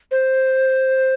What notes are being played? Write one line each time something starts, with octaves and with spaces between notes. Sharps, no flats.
C5